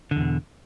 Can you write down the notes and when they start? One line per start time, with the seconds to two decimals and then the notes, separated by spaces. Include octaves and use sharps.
0.11 D3
0.16 E2
0.21 B2